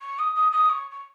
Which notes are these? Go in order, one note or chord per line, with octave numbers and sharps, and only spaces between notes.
C#6
D#6
D#6
D#6
C#6
C#6